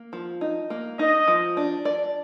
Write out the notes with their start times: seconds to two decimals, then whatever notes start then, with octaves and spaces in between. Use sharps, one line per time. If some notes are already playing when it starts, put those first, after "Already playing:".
Already playing: A#3
0.13 F3
0.41 D#4
0.70 A#3
0.99 D#4 D#5
1.28 F3
1.57 D4
1.85 D5